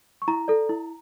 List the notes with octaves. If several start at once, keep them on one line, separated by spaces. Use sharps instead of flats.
C#6
E4 A#5
A4 D5
E4